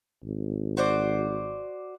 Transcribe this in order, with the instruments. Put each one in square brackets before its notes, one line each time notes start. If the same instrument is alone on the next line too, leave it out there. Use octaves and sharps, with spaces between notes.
[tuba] G#1
[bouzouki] F#4 C5 D5